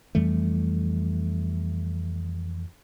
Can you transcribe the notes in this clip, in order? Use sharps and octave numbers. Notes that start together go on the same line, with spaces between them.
F2 E3 G3 A3